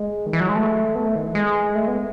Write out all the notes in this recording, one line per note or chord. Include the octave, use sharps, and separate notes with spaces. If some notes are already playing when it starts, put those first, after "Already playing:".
Already playing: G#3
D#3
E3
F#3
G#3
A3
B3
A3
D#3
E3
G#3
A3
B3